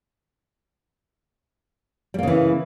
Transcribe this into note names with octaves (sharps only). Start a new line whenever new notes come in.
C#3 E3 G3 A#3